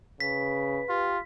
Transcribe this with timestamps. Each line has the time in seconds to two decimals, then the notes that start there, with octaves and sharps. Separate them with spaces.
0.20 C#3 B4 B6
0.89 F4 G4